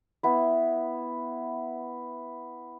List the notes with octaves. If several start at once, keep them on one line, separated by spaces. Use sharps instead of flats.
B3 E4